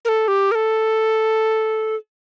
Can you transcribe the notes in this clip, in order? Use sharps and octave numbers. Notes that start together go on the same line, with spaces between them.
A#4
A4
G4
A#4
A4